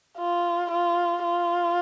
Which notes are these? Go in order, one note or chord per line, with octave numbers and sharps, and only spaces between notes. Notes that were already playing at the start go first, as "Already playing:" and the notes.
F4
F4
F4